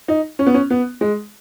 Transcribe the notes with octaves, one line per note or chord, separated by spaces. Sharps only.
D#4
C#4
B3
C#4
B3
G#3